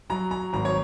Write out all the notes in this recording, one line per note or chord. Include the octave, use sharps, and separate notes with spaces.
F#3 A#5
A#5
G#1 A#5
C#5